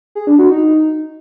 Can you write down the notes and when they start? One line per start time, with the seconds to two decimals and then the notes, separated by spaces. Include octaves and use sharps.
0.15 G#4
0.27 D4
0.39 F#4
0.50 D#4